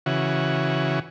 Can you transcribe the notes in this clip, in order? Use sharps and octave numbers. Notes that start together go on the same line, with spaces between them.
C#3 E3 F#4